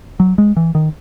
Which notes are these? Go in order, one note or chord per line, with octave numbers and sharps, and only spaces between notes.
F#3
G#3
E3
D#3